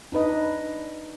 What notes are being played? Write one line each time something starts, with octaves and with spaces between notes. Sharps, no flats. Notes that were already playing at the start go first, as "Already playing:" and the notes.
D4 D#4 B4 D#5